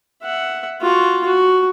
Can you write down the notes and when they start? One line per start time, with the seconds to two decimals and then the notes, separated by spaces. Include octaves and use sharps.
0.23 E5 F#5
0.81 F4 F#4
1.26 F#4